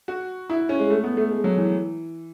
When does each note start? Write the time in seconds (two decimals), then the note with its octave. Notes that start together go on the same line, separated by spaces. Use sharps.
0.08 F#4
0.50 E4
0.69 C#4
0.79 G#3
0.90 A3
1.04 B3
1.17 A3
1.31 G#3
1.44 F#3
1.58 E3